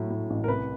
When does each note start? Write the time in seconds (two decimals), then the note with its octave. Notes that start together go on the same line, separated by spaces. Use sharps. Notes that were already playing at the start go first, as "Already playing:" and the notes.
Already playing: A2 F#3
0.10 A2
0.30 A1
0.44 A#4
0.48 C2 B4